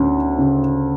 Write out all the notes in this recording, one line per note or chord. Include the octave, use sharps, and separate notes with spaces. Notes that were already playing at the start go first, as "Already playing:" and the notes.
Already playing: D2 C#4
C#3